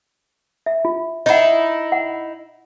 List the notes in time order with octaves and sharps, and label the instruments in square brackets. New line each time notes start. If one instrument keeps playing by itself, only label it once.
[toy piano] E5
F4
[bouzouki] D#4 E4 [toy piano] D#5 F#5
[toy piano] F#5